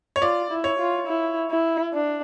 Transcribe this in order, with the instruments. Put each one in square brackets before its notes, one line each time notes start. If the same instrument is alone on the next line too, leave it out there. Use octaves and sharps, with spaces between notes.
[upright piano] C#5
[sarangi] F4 [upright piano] D5
[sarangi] E4
[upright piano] C#5
[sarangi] F4
E4
E4
D4